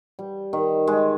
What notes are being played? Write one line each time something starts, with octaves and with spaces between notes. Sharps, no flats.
G3
D#3
G#3